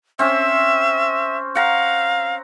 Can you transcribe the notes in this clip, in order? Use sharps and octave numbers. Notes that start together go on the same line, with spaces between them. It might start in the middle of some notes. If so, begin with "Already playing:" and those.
C4 C#4 E5
F5 F#5 A#5